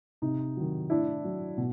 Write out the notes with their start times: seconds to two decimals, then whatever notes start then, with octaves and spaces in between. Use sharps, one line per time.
0.22 C3 D#4
0.57 D#3 F#3
0.90 A2 D4 E4
1.24 F#3
1.58 B2